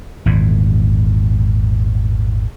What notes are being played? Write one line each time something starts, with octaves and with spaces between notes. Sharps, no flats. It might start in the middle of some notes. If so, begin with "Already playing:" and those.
G#1 E2 A#2